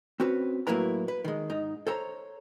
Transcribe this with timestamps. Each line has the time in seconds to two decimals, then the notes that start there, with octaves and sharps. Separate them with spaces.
0.20 C4 C#4 F#4 B4
0.67 A2 F#3 A#3 E4 B4 A#5
1.08 B4
1.24 D#3 G#3
1.50 G#2 D#4
1.87 A4 C5 C#5 A#5